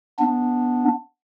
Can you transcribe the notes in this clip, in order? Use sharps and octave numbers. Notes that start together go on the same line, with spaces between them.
B3 D4